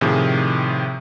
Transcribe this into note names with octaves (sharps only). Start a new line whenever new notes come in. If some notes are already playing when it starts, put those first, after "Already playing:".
A2 C3 D#3 F3 G#4